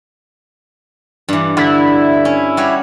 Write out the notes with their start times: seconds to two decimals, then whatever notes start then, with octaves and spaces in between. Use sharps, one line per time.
1.29 G2 E3
1.57 D3 E4
2.25 C#4
2.57 G3 F#4 C#5